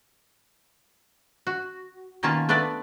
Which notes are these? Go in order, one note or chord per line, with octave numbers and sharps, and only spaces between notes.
F#4
B2 D#3 A#3 C#4 F4 A5
A3 B3 D4 A4 B4 D5